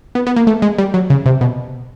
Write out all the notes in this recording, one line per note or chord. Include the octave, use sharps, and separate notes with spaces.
B3
B3
A#3
A3
G#3
G3
F#3
C#3
C3
B2